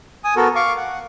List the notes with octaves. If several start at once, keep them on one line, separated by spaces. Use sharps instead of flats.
G#5 D#6
B3 F#4 A4 A#4
F5 C#6 D6
F#5